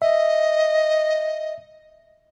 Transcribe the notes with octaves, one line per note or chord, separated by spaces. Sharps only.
D#5 E5